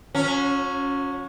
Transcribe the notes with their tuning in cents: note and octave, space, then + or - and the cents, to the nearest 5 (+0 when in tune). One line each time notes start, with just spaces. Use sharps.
F#3 -40 C#4 +0